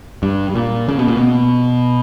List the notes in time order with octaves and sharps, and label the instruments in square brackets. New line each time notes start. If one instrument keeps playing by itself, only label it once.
[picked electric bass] G2
G2
A#2
C#3
B2
A#2
B2